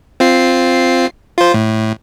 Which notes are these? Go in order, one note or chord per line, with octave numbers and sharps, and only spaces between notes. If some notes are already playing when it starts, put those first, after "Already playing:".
C4 F4 C7
F4 C5
A2